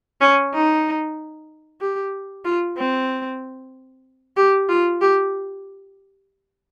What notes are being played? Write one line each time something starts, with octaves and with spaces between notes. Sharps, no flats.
C#4
D#4
G4
F4
C4
G4
F4
G4